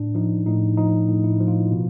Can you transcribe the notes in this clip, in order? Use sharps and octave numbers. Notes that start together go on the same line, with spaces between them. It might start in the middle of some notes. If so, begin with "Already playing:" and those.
Already playing: A2 D4
F3 D#4
A2 D#4
F3 D#4
A2
E4
F3
F4
B2